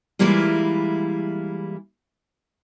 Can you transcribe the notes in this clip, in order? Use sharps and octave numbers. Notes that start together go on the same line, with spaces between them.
E3 G3 G#3 A#3 E4 F4